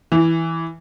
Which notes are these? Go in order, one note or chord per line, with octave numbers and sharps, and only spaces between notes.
E3